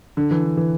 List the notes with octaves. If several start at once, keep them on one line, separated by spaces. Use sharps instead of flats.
D3
E3
D3
E3